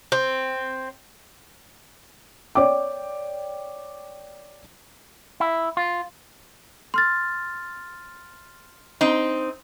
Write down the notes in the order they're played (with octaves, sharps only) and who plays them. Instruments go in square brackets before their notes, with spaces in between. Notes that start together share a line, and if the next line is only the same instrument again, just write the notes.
[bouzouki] C4
[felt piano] C#5 D5 G5 D6
[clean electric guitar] E4
F4
[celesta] C6 F6 A6
[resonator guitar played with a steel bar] C4 D#4